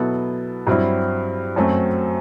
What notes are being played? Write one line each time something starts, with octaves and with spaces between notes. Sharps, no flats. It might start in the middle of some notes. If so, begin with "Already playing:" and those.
Already playing: B2 F#3 B3 E4 A4
G2 F#3 C4 E4
F#2 F#3 A3 C4